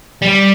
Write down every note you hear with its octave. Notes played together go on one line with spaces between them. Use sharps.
G3